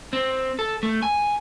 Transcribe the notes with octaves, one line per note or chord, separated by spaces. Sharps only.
C4
A4
A3
G#5